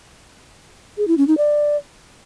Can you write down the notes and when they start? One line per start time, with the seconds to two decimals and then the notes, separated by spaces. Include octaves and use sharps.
0.98 G#4
1.08 E4
1.18 C#4
1.28 D#4
1.38 D5